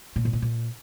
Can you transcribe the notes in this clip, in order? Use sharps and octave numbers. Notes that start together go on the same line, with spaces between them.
A#2
G#2
A2
A#2